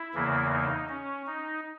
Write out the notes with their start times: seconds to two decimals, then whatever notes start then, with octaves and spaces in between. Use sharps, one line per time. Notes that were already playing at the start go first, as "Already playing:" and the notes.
Already playing: E4
0.14 E2 C#3 E3 A#3
0.51 D#4
0.89 C#4
1.26 D#4